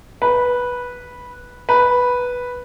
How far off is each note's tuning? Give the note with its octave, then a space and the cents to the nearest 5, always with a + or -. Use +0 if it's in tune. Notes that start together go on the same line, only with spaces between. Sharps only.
B4 -10
B4 -5